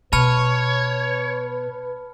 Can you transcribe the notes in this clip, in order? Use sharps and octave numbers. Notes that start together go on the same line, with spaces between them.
B2 B4 C#5 A5 B5 F6